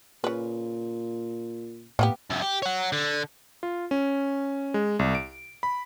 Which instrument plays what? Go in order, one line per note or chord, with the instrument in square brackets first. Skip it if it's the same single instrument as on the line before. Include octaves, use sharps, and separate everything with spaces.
[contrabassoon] A#2 [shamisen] C#3 B4
[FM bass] A2 [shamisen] A#3 B3 G4
[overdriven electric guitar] C#2 F#2
G4
C#5 F#5
D3
[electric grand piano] F4
C#4
G#3
C2
D7
B5